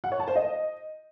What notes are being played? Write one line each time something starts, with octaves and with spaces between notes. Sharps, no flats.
F#5
C#5
A5
C5
D#5